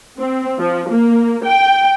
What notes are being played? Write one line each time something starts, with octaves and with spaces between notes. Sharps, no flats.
C4
F3
A#3
G5